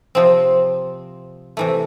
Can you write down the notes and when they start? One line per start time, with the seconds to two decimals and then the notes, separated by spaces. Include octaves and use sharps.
0.15 C3 F3 C4
1.57 C3 E3 A3